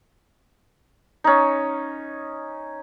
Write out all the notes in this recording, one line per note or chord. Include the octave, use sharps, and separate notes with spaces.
C#4 D#4